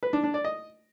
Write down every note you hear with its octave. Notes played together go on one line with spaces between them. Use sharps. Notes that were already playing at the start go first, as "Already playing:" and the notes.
B4
D4
D4
D5
D#5